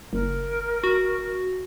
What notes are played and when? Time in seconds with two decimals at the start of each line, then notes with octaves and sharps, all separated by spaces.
0.13 F#1 A#4
0.84 F#4